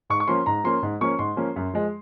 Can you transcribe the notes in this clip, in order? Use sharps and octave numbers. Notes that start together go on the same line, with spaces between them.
G#2 C#6
C#6
F3 A#3 C#4 C6
G#2 A#5
F3 A#3 C#4 C6
G#2
F3 A#3 C#4 C#6
G#2 C6
F3 A#3 C#4
F#2
F3 G#3